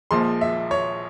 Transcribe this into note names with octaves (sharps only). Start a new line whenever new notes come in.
A#1 A#2 F3 G#3 C6
E5
C#5